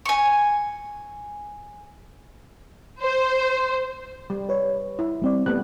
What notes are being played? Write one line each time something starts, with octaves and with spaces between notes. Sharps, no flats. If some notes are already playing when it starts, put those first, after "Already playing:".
G#5 C#6
C5
G3
B4 C#5
E4
G3 C4 D5
G3 A3 B3 F#6